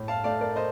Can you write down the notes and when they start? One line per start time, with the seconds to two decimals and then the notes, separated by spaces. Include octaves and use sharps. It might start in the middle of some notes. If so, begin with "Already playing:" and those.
Already playing: A2
0.08 F5 A5
0.24 A3 D5 F5
0.41 A#4 D5
0.56 C5 D#5